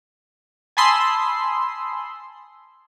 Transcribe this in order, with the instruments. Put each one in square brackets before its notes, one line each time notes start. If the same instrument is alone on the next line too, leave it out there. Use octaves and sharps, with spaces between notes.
[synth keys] G#5 A5 B5 C6 D#6 E6